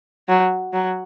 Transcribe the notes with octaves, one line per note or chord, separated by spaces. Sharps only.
F#3
F#3